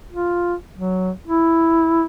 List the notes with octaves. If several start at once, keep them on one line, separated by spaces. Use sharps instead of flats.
F4
F#3
E4